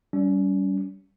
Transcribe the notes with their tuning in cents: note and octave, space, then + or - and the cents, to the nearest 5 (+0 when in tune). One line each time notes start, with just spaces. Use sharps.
G3 -20 C#4 +30